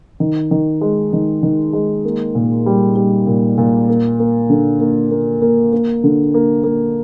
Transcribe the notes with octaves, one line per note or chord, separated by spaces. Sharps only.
D#3
D#3
G#3
D#3
D#3
G#3
A#3
A#2
G3
G3
A#2
A#2
A#3
A#3
D3
A#3
A#3
A#3
A#3
D3
A#3
A#3